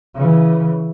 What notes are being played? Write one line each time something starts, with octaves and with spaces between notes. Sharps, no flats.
C#3 E3